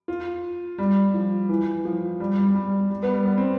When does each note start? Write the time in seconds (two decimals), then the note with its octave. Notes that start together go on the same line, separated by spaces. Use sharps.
0.08 F4
0.78 G3
1.14 F3
1.49 E3
1.85 F3
2.20 G3
2.37 G3
2.55 G3
2.90 G3
3.03 B3
3.14 G3
3.25 B3
3.37 C4